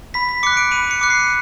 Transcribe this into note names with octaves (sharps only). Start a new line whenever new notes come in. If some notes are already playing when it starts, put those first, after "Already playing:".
B5 B6
B6
D6 F#6 C#7
D7
B5 D#7
C#7
D6 F#6 C#7
C7